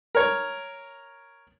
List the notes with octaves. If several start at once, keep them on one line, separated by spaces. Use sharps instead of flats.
A#4 C#5